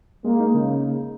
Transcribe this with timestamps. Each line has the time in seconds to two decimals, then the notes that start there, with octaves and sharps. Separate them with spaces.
0.24 G#3 A#3
0.39 D#4
0.54 C#3